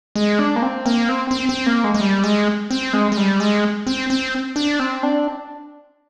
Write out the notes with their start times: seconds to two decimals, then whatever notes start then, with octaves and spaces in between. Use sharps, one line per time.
0.16 G#3
0.39 D4
0.56 A#3
0.62 C4
0.86 A#3
1.09 C4
1.31 C4
1.49 C4
1.66 A#3
1.84 G#3
1.94 G#3
2.01 G3
2.24 G#3
2.71 C4
2.93 G#3
3.12 G#3
3.17 G3
3.40 G#3
3.87 C4
4.10 C4
4.56 D4
4.79 C4
5.03 D4